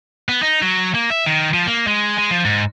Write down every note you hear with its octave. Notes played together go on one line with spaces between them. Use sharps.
B3
D#4
F#3
A#3
E5
D#3
F3
A#3
G#3
G#3
F3
G#2